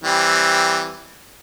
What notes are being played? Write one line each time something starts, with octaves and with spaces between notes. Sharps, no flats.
E3 G3 C4